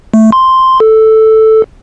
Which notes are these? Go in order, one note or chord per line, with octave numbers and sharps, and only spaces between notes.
A3
C6
A4